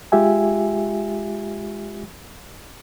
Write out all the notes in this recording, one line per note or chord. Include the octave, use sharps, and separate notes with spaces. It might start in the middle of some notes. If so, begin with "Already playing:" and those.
G#3 F4 G4 E5 G#5